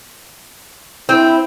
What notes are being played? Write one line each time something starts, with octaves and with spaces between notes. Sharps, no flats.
C4 E4